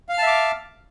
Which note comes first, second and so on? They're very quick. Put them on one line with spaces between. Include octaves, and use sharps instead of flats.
F5 F6 A5 E5 D6